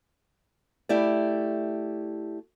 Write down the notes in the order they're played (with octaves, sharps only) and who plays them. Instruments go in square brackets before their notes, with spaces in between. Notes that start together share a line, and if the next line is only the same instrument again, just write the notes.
[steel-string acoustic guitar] A3 E4 G4 D5